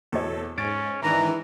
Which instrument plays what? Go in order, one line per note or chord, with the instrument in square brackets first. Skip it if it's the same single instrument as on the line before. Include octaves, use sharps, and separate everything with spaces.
[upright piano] E2 B2 C#5 [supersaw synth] A4
[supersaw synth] G#2 [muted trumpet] C#4 [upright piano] A6 D7
[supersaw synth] G#2 D#3 D4 [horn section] E3 [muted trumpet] A#5